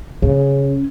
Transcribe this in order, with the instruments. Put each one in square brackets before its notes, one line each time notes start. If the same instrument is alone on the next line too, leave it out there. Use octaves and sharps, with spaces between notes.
[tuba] C#3 [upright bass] C#4